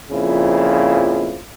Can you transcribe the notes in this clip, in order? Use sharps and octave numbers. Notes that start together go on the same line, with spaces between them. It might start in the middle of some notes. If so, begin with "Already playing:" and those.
F2 A#2 C#3 F3 E4